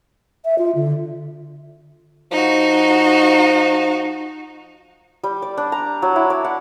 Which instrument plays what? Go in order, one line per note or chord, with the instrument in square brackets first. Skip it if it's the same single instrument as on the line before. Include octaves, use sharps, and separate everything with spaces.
[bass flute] E5
F4
D3
[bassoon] F3 [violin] D#4 F#4
[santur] G3
D5
D4
A#5
F#3
E4
D5
F#5